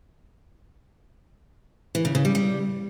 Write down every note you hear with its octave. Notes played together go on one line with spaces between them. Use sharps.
E3
C#3
C#3
G3
G3